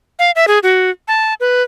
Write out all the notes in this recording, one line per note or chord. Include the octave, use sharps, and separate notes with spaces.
F5
E5
G#4
F#4
A5
B4